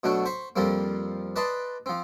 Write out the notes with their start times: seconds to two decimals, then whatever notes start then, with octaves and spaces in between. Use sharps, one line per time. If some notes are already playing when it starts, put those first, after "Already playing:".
0.04 B2 F#3 A3 D4
0.25 C5 B5 C#6
0.56 F2 F3 G3 A#3 C4
1.36 B4 D5 D#5 A5 B5 C6
1.86 F3 C4